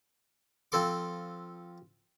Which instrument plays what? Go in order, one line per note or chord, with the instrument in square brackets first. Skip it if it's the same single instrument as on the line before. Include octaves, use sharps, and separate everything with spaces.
[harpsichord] F3 C4 A4 C6 D6